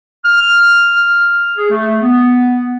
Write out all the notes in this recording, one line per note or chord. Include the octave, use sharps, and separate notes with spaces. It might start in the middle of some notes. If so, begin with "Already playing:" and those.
F6
G#4
A3
B3